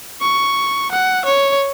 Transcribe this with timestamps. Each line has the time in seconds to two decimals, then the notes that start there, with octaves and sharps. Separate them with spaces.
0.22 C#6
0.92 F#5
1.26 C#5